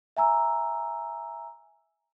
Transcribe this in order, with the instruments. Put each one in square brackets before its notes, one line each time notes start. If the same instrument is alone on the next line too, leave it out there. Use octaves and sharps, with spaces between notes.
[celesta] E5 G#5 A#5 E6